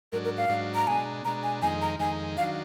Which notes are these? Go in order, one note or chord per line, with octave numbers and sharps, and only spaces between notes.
G#2 F#3 D4 A#4
A#4
F5
G#2 F#3 D4
A#5
B2 G#3 D4 G#5
B2 G#3 D4 A#5
G#5
F2 D#3 G#3 D#4 G#5
A#5
F2 D#3 G#3 D#4 G#5
D#3 F#3 D4 F5